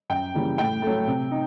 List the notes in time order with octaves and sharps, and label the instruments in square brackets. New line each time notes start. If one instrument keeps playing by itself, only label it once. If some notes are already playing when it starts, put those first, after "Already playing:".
[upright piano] F#2 G5
C#3 E3 G3 A#3
A2 G5
F#3 A3
C3
D#4